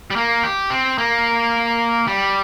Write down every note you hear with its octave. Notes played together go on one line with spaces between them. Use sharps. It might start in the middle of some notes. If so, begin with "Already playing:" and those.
G3
A#3
G4
C4
A#3
G3